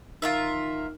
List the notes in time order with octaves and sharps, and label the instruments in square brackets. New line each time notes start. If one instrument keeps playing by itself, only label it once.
[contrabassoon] D#3 [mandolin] F4 A#4 E5